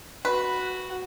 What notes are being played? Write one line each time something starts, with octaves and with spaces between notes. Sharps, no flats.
F#4 B4